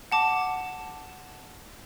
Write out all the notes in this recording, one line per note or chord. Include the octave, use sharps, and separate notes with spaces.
F#5 A5 D6